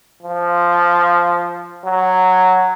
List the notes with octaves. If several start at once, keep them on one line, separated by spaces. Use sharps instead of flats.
F3
F#3